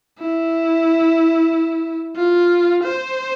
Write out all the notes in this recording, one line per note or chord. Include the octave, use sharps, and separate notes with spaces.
E4
F4
C5